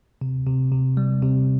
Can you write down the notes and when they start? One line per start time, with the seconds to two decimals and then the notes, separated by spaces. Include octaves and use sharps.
0.21 C3
0.47 C3
0.72 C3
0.97 G3
1.22 C3